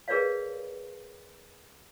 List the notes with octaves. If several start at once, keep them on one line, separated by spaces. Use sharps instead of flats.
G#4 A#4 B4 C#5 D5 F5